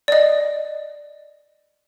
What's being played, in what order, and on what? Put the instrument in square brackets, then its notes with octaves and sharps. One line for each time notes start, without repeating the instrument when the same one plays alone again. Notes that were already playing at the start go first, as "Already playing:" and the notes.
[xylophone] D5 D#5